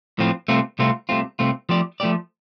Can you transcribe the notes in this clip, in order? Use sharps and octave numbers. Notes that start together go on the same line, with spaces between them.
A2 F3 C4
C2 C3 A3 C4 F4
C2 C3 A3 C4 F4
C2 C3 A3 C4 F4
C2 C3 A3 C4 F4
F3 A3 C4 G4 D5
F3 A3 C4 G4 D5